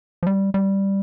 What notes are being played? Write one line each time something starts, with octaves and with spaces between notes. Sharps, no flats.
F3
G3
G3